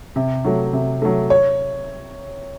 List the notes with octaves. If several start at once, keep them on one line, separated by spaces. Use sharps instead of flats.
C3
F#3 A3
C3
F#3 A3
C#5